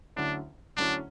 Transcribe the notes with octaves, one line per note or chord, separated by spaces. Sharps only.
D2 D3 F#3 C#4 D4 E4
D2 D3 F#3 C#4 D4 E4